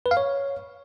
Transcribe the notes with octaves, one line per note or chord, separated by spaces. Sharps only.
B4
F5
C#5